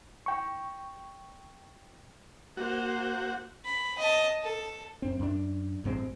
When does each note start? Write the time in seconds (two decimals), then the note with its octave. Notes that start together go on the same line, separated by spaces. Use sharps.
0.26 G5 C#6
2.57 A#3 F#4 C5
3.65 B5
3.98 D#5 A5
4.43 A4
5.02 F#2 C4
5.20 F#2 D4
5.84 A1 G2 G#3 C4